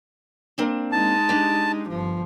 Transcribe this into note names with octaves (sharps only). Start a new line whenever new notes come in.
A#3 C4 D4
G#3 D#4 A5
D4 G4
G1 F3